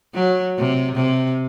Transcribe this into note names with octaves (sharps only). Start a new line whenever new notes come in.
F#3
C3
C3